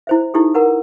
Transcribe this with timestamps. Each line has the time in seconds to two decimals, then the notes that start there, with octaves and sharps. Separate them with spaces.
0.07 E4 C5 E5
0.34 D#4 E4 G4 A4
0.54 A#4 B4 F#5 A#5